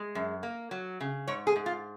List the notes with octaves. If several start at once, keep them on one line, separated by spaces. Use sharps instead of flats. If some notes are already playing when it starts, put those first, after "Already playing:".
Already playing: G#3
F#2
A#3
F#3
C#3
G#2 C#5
G#4
G#2
F4